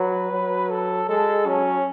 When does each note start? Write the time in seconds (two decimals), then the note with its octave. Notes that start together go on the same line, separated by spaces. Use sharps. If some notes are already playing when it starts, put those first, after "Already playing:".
Already playing: F#3 B4
0.32 F#3
0.70 A4
1.09 G#3 A4
1.46 F#3 C#4